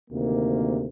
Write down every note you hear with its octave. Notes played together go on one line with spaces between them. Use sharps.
D2 C3 D#3 A#3